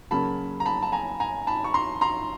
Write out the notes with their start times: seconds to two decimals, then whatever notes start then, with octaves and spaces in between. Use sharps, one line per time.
0.11 C#3 F#3 A#3 C#4 A5 B5
0.60 A#5
0.66 A5 B5
0.83 A5
0.92 G#5 A#5
1.20 G#5 A#5
1.47 A5 B5
1.64 C#6
1.74 A#5 C6
2.01 A#5 C6